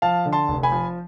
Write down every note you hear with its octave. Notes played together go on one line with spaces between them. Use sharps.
F3 F5 A5
D3
A5 C6
F1
G#5 B5
F3